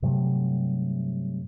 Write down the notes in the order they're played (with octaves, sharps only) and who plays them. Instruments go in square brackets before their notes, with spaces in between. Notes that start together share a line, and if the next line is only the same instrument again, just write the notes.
[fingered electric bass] G2 C3 F#3 A3